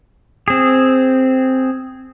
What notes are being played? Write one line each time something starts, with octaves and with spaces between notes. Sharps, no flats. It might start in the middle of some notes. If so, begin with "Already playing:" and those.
C4 G#4